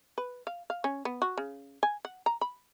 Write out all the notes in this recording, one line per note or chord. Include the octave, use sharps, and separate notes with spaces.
B4
F5
F5
C#4
B3
F#4
C#3
G#5
F#5
A#5
B5